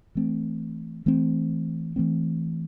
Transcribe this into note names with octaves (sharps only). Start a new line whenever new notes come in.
E3 A3 C4
E3 A3 C4
E3 A3 C4